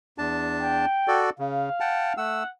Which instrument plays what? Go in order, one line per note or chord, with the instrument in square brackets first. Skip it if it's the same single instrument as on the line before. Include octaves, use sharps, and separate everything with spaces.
[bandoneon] E2 D4 A5
[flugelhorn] G5
[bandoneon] F#4 A4 D5
[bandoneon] C#3 [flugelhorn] F5
[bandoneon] F#5 G5 A5
[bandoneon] A3 E6 [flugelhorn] F#5